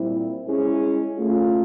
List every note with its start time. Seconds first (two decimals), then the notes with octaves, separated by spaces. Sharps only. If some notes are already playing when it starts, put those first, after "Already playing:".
Already playing: A#2 G3 C4 E4
0.47 G#3 C#4 E4 G#4
1.18 A3 C#4 F4